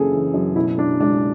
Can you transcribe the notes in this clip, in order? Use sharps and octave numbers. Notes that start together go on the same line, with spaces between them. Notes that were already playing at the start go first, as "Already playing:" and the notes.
Already playing: F#1 F#2 C#3 E3 G#4 A4
E3
F#2
B2 E4
B2 D4
C#2 D4